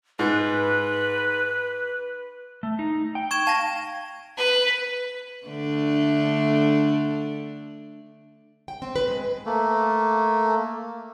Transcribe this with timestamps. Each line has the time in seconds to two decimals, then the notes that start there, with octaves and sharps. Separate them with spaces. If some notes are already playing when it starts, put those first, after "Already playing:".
0.19 G#2 B4
2.63 A3
2.79 D#4
3.15 G5
3.31 C#6 G#6 E7
3.47 F5 A5 A#6
4.37 B4
5.46 D3 A3 D4
8.68 G5
8.82 C4
8.96 B4
9.08 G#3
9.46 A3 A#3